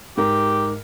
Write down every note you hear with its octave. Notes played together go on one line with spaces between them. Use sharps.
G#2 G4 A#4